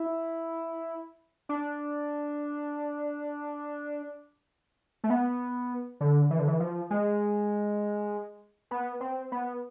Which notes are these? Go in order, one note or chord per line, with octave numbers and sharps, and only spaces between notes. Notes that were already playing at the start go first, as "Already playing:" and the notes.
Already playing: E4
D4
A3
B3
D3
E3
D3
E3
F3
G#3
B3
C4
B3